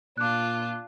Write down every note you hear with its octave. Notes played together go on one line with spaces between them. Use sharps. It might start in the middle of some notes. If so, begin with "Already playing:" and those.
A#2 D4 F4 D6 F#6